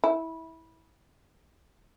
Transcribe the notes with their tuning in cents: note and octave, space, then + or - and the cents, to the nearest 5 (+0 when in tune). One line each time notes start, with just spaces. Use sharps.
E4 -20